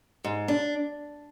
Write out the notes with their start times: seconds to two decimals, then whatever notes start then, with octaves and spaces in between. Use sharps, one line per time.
0.24 G#2
0.48 D4